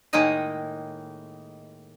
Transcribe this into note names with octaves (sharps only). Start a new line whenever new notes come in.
A2 D#3 G#3 A#3 D#4 D#5